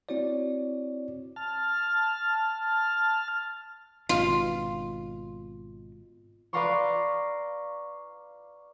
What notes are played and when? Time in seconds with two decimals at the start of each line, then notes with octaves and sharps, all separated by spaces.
0.09 C4 E4 F#4 C#5 D5
1.36 A5 F6
4.09 G#1 B2 F4
6.53 B4 D5 F5 A#5 C6 C#6